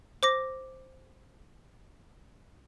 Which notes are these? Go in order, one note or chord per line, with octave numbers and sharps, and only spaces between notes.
C5 D6 A#6